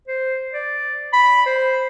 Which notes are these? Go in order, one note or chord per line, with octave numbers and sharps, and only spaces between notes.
C5
D5
B5
C5